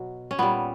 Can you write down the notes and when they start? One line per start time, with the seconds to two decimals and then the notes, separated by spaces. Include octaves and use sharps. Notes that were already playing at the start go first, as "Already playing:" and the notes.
Already playing: B2 F#3
0.31 C#4
0.39 A#2 G3 B3